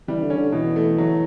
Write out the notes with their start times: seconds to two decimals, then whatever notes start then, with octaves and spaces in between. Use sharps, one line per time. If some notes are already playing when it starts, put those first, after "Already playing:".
0.08 E3 G3
0.22 D3
0.30 C#4
0.37 D3
0.52 B2 E3
0.76 A3
0.98 F#3